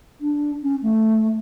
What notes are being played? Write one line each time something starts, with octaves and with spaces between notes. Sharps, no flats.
D4
C#4
A3